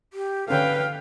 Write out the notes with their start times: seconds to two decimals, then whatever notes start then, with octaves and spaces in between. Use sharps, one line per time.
0.13 G4
0.48 D3 C#4 A4 B4 F5 G5